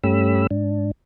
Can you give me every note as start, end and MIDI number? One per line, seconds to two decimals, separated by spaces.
0.04 0.47 43
0.04 0.47 57
0.04 0.47 61
0.04 0.47 67
0.04 0.47 83
0.04 0.47 88
0.51 0.91 44
0.51 0.91 62